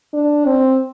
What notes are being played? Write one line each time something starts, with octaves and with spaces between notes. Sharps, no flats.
D4
C4